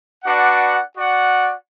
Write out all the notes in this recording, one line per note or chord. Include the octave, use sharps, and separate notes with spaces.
D4 F#4 B4 D5 F#5
F#4 D5 F#5